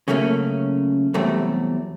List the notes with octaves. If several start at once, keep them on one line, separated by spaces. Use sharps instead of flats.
C#3 F#3 A3 A#3 C#4
E2 C3 F#3 G3 A3 C4